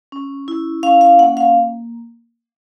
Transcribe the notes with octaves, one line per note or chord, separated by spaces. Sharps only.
C#4
E4
C#4 F5
F5
A#3 F#5
F5